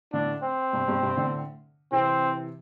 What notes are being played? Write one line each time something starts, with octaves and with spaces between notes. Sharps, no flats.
A2 D3 D4
C4
G2 C3
G2 C3
G2 C3
A2 D3
C3 E3 C4